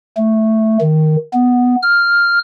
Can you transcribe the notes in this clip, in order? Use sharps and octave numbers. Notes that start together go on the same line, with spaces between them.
A3
D#3
B3
F6